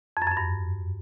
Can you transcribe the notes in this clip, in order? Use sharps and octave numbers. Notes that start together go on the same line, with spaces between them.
F2
F#2
F2
F#2
G2